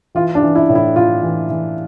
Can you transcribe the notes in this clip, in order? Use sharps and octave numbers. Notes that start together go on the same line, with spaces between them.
E3 F4
D4
E3
E4
A2
E4
A2 F4
E3
E3